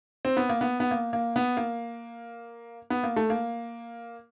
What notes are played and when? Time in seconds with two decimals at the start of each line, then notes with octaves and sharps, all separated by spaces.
0.25 C4
0.37 B3
0.49 A#3
0.61 B3
0.80 B3
0.91 A#3
1.13 A#3
1.36 B3
1.57 A#3
2.90 B3
3.03 A#3
3.16 A3
3.30 A#3